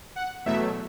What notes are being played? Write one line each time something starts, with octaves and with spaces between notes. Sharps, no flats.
F#5
E2 B2 F#3 A3 E5